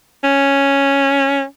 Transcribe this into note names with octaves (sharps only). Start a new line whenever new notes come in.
C#4